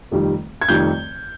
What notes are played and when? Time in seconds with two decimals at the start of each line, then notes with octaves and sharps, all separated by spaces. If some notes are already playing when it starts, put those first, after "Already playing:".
0.11 F1 F2 D#3 G3
0.61 G#6
0.69 F1 F2 D#3 G3 G6